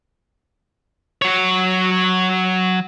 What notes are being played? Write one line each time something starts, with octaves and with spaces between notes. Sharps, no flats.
F#3 C#5